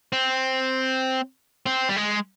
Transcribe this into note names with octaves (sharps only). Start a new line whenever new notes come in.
C4
C4
G3
G#3